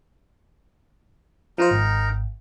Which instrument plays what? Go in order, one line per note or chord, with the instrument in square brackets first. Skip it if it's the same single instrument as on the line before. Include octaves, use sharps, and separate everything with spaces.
[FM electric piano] F3 F4 C5 [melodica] D#4 A#4 A#5
[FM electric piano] G#1